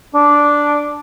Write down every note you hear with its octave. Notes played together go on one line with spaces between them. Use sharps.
D4